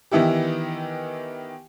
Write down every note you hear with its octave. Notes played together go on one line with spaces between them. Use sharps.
D#3 E3 B3 E4 G4